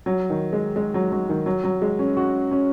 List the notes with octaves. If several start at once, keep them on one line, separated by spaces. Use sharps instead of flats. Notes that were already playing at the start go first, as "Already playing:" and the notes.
F#3
D#3
G#3
G#3
F#3
F#3
D#3
F#3
F#3
G#3
C#4
F#4
C#4